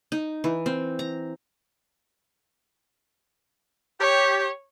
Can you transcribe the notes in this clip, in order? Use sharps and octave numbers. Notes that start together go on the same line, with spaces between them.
D#4
E3
C4
A#5
G4 C#5